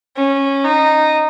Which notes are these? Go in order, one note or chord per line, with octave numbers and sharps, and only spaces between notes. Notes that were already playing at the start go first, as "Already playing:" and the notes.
C#4
D#4